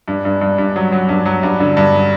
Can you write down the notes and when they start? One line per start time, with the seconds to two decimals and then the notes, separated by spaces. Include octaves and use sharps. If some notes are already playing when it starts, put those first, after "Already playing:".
0.08 G2
0.25 G2
0.41 G2
0.58 G2
0.76 F#3
0.92 F#3
1.09 G2
1.26 F#3
1.43 G2
1.60 D3
1.77 G2